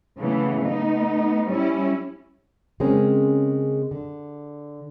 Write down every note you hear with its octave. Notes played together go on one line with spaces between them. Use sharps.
C#3 E3 A3 B3
A3 B3 D#4
G3 C#4 E4
C#3 G#3 C4 C#4 A#4
D3